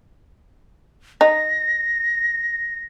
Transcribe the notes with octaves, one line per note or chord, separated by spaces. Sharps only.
D#4 A#6